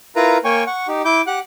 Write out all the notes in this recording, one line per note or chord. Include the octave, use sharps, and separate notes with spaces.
E4 F4 A#4 B4 A#5
A#3 C#5 G5 G#5 C#6
F#5 C#6
D#4 G4
E4 D6 G6
G4 F#5 F#6